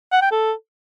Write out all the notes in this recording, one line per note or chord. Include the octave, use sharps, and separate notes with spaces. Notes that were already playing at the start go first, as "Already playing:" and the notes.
F#5
G5
A4